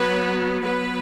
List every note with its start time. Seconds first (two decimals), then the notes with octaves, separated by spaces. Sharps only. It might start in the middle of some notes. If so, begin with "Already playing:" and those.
Already playing: F#3 B3 B4
0.63 F#3 B3 B4